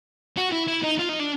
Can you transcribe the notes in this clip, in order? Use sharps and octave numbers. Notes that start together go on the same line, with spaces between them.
F#4
E4
E4
D#4
F4
D#4
D4